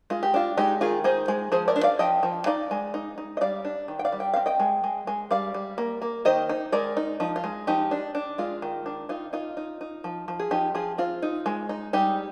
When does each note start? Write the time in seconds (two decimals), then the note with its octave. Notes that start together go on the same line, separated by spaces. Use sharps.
0.10 G#3 F4
0.23 G4
0.34 D4 F4
0.57 G#3 D#4 G4
0.81 D#3 F4 G#4
1.04 D#4 G#4 C5
1.28 G#3
1.52 F3 G#4 C5
1.68 A#4 D5
1.76 D4
1.83 D5 F5
1.99 F3 D#5 G5
2.23 F3
2.46 D#4 D5 F5
2.71 G#3
2.94 D#4
3.18 D#4
3.37 D#5
3.41 G3 D5 F5
3.65 D4
3.88 D#3
3.99 G5
4.05 D5 F5
4.12 G3
4.20 G5
4.34 C4 F5
4.46 D#5 G5
4.60 G#3
4.84 G#3
5.07 G#3
5.31 G3 D5 F5
5.54 G3
5.78 A#3
6.02 A#3
6.25 D#3 C5 D#5
6.49 D#4
6.72 G#3 A#4 D5
6.97 D#4
7.20 F3 D#4
7.36 F4
7.44 G#3
7.67 F3 D#4 G4
7.91 D4
8.15 D4
8.38 G#3 F4
8.62 D#3
8.86 D4
9.09 D#4 F4
9.33 D#4 F4
9.57 D#4
9.81 D#4
10.04 F3
10.28 F3
10.39 G#4
10.51 F3 D#4 G4
10.75 F3 F4 G#4
10.98 C4 F4
11.22 D#4
11.46 G#3
11.69 D#4
11.93 G3 D#4 G4